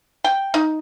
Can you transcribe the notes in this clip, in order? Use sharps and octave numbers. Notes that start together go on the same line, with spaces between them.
G5
D#4